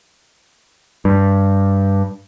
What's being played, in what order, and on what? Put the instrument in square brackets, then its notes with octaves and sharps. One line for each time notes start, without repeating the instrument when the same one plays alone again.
[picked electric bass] G2